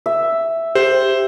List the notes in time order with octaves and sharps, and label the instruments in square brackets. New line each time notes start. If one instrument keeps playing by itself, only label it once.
[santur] E5
[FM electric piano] G4 [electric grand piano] C5